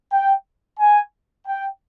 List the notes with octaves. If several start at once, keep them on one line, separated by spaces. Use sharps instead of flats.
G5
G#5
G5